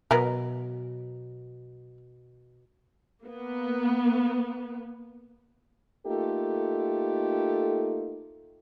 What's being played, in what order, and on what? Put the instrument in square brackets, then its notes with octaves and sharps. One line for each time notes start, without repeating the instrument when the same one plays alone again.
[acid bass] B2 [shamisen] F#3 B3 A#4
[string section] A#3 B3
[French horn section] A3 A#3 D#4 F4 G4 A4